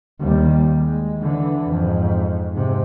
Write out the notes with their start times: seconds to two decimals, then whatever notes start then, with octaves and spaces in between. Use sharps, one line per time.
0.20 D#2 G3
0.77 G#3
1.20 D3 E3
1.71 F2 G#2
2.54 G#2 C3